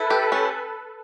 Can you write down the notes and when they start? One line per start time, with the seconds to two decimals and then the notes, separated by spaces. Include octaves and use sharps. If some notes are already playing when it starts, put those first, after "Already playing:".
Already playing: E4 A4 B4
0.10 G4
0.32 C#4